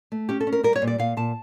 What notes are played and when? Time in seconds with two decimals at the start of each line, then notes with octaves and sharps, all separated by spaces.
0.12 A3
0.29 C#4 G4
0.40 A4
0.47 C#4
0.53 A#4
0.63 G3 A#4
0.76 C#5
0.82 A#2
0.87 D5
0.98 A#2 F5
1.17 A#2 A5